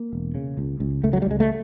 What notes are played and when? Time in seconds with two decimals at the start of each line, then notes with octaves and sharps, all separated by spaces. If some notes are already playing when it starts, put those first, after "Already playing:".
Already playing: A#3
0.13 E1
0.35 C#3
0.57 C#2
0.80 C#2
1.03 C#2 A3
1.13 F#3
1.22 G3
1.27 C#2 G#3
1.40 A3